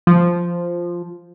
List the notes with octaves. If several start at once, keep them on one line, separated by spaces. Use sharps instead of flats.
F3